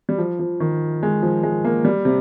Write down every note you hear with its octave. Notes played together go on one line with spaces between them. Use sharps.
G3
F3
F3
D#3
G#3
F3
G#3
A#3
G3
C3